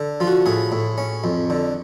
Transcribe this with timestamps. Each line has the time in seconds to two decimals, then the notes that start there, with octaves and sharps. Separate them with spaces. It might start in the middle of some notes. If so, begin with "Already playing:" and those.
Already playing: D3
0.20 F3 F4
0.27 F#4
0.46 A2 G#4
0.72 A2
0.98 C#4
1.24 F2
1.50 D3